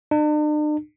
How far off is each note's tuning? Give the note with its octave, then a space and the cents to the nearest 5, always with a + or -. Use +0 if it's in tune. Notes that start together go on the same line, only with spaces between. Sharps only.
D4 +45